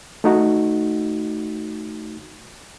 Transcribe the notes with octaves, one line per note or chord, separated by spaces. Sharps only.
A3 D#4 F#4